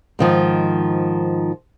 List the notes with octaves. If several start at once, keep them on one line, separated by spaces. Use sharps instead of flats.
G#2 D#3 F3